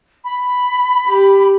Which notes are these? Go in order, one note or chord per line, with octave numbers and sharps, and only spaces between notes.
B5
G4